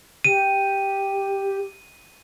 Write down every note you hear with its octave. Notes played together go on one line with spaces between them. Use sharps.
G4 D#7